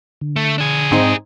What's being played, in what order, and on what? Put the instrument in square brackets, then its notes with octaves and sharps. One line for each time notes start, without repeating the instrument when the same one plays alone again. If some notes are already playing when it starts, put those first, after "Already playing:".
[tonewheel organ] D3
[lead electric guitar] A3
D4 G#4
[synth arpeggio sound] G#2 C4 D#4